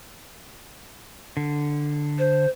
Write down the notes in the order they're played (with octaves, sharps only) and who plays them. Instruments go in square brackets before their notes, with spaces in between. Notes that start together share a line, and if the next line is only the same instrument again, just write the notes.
[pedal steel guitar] D3
[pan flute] C5